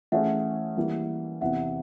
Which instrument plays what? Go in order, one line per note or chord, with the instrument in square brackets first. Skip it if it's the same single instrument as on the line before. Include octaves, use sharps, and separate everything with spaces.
[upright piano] E3 A3 C#4 E4 G#4 [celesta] E5 F#5
[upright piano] E3 G3 A#3
[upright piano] E2 C3 E3 [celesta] E5 F#5